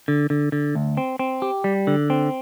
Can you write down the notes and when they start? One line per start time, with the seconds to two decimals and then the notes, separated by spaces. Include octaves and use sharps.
0.08 D3
0.30 D3
0.52 D3
0.75 D2
0.97 C4
1.19 C4
1.42 G4
1.64 G3
1.87 D3
2.10 C4